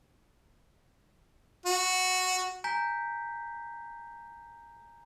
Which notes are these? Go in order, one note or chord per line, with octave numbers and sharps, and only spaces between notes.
F#4
G#5 A#5 G6 B6